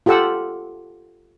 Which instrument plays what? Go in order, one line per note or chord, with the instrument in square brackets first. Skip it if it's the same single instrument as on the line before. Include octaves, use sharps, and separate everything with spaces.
[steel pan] F4 G4 A4 F#5 E6